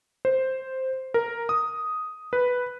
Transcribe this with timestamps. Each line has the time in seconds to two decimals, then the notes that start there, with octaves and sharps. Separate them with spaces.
0.25 C5
1.14 A#4
1.49 D#6
2.33 B4